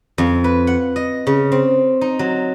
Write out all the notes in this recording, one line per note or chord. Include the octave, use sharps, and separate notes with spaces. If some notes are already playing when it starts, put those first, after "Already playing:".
F2
B4
F#5
D#5
C#3
C4
D#4
F#3